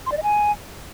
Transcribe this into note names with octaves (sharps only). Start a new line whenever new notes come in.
C6
D5
D#5
G#5